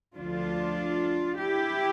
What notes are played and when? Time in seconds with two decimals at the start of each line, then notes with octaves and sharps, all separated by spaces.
0.15 D2 D3 F3 D4 F4
1.36 E4 G4